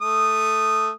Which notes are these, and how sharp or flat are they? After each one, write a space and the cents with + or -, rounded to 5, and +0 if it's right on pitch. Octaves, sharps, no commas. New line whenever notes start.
A3 +0 D#6 -10